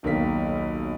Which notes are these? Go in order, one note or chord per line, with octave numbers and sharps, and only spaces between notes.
D#1 B1 D#3 A#4 F5 B6